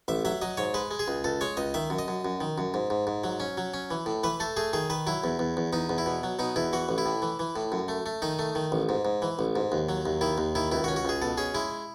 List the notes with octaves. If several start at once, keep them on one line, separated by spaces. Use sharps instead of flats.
A1 E5
F#3 E5
F#3 D#5
G#2 C#5
G#3 B4
G#3
G#4
C#2
C#2 A4
G#3 C#5
C#2 D#5
D#3 E5
F#2
D#5
F#2
F#2
D#3
F#2
G#2
G#2
G#2
F#3
C#4
F#3
C#4
E3
A2
E3 B4
A3 A4
A3 G#4
D#3 G#4
D#3 B4
F#3 E4
E2
E2
E2
E2 D#4
E2
E4
B2
F#3
B2 D#4
E2 E4
E3 F#4
A1
E4
A2
E3
E3
A2
F#2
A3
A3
D#3 D#4
A3
D#3
A1
G#2
G#2
E3
A1
G#2
D#2
F#3
D#2
D#3 E4
D#2
D#3 E4
C#2 E4
F#4
C#4
F#4
C#2 G#4
B2 A4
C#4 G#4
G#3 E4